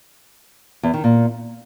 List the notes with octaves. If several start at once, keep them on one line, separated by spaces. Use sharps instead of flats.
E2
D#3
A#2